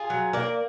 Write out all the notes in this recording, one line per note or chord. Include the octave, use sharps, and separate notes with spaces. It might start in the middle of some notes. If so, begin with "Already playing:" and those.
Already playing: F4 G#4
F#3
A#3 A#4 D5